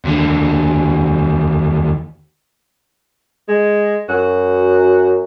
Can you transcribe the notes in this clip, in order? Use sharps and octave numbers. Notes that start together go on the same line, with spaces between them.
D#2 D3
G#3
F#2 F#4